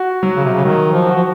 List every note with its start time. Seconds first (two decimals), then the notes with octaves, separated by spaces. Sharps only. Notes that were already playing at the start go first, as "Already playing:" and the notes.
Already playing: F#4
0.23 F#3
0.37 C#3
0.45 C3
0.54 C#3
0.64 D#3 F#3
0.93 F3
1.07 F#4
1.16 F3